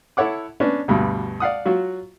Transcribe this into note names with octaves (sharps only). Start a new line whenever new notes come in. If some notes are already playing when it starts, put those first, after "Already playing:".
E4 A4 C#5 F#5 D6
B3 C#4 D4
D2 G2 B2
D5 F5 F#5 D#6
F#3 F4 F#4